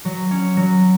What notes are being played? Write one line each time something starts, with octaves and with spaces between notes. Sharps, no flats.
F#3
C#4
F#3